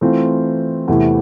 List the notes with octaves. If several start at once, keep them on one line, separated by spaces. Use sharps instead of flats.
E3 A3 C4 F4
E2 C3 E3 A3 E4